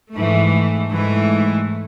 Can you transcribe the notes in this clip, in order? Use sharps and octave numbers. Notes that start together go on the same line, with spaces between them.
G#2 E3 A3
A3
G#2 E3